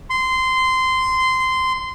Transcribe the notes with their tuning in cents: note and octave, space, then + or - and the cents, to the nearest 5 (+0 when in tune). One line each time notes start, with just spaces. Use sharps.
C6 -15